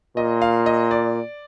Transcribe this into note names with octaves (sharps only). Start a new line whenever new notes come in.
A#2 D#5
F5
D#5
D5